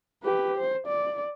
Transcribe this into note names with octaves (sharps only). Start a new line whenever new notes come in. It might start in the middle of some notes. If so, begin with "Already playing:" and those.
G4 B4
C5
D5